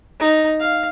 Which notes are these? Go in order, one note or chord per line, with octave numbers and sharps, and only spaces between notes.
D#4
F5